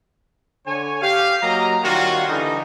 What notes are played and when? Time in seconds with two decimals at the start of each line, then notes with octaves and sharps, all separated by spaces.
0.67 D3 C#5 G#5
1.02 G4 F5
1.42 F#3 A#3 A#4 D#5 A#5
1.84 D#3 G3 A#3 C#4 F4 F#4
2.28 D3 E3 G3 D#4